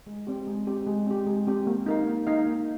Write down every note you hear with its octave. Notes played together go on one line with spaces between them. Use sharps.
G#3
C4 G4
G#3
C4 G4
G#3
C4 G4
G#3
C4 G4
A#3
D#4 A#4 F5
A#3
D#4 A#4 F5
A#3